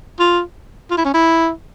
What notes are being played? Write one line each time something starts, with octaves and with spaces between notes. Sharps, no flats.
F4
F4
E4
C#4
E4